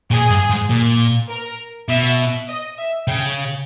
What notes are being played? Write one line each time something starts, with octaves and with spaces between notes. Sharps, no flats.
A#2 G#4
G2
G#2
A#2
A#4
B2 E5
D#5
E5
C#3 G5